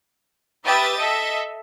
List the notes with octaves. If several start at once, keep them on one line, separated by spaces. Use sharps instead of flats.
G4 B4 E5 G5 D#6 A6
A4 D#5 E5